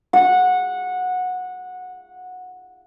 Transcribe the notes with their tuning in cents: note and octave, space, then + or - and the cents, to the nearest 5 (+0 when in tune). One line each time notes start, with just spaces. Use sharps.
F#5 -15